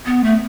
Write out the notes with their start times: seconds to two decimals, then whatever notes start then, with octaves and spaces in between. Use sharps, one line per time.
0.06 B3
0.24 A3